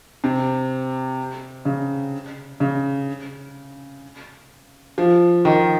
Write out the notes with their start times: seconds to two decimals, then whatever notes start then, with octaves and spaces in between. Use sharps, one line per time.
0.24 C3
1.65 C#3
2.60 C#3
4.98 F3
5.45 D#3